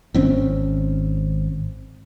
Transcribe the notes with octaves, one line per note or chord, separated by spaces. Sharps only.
G#1 C4 C#4